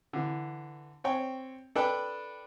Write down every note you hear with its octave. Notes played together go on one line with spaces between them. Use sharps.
D3 E3
C4 C#5 G5
D4 A4 B4 G5